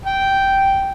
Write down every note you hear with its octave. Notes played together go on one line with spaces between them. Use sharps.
G5